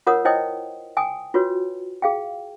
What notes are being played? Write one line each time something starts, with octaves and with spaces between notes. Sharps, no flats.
F4 A#4 C#5 F#5 D#6
E4 C5 C#5 D#5 G5 D#6
G5 G#5 D#6
F4 F#4 B4 C#5
G#4 F5 G5